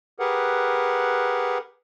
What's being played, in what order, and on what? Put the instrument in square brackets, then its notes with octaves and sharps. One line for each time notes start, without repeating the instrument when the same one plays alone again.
[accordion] G4 G#4 A#4 B4 F#5